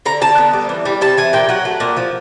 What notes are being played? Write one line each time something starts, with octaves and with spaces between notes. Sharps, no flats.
D3 A#5
D3 A5
B3
G3
E3
G3
C3 A5
E3 G#5
A#2 G5
F#3 F#5
A3
A#2
F3